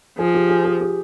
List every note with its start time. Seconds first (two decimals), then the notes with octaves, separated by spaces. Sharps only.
0.18 F3 G#4
0.35 G4
0.49 G#4
0.65 G#4
0.81 G4